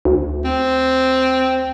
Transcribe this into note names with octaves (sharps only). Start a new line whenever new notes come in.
D2
C4